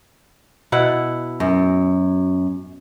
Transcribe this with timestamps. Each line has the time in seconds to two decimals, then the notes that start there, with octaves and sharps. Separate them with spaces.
0.72 B2 E4 F#5
1.40 F#2